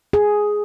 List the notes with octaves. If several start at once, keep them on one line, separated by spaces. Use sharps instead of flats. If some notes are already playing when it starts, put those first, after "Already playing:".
G#4